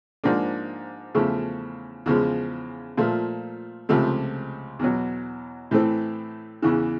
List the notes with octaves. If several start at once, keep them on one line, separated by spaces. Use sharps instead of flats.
G#2 F3 A#3 D4
E2 C#3 F3 A3
E2 C#3 F3 G#3
A#2 F3 A3
C#2 C3 F3 A3
E2 B2 F#3
A2 E3 A3 C4
E2 C#3 E3